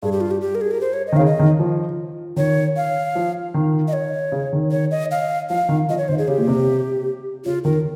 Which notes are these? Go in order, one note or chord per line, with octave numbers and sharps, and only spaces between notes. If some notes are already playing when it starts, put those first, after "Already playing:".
G2 G#4
G4
F4
G4
G4
A#4
G#4
A#4
C5
C#5
D#5
D#3
C#3 F5
D#5
D#3
F3
D#3 C#5
F5
F3
D#3
D#5
C#5
C#3
D#3
C#5
D#5
F5
F3 F5
D#3
F3 D#5
C#5
D#3 C5
G#4
C#3 G4
A#2
C3
C#3 F4
D#3 A#4